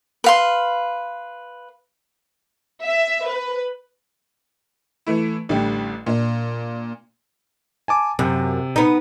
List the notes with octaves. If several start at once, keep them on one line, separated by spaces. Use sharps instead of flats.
B4 F5 C6
E5
B4
E3 A3 E4
A1 D3 G3 A3
A#2 D4
G#5 A5 D6
F#2 C3
B3 D#4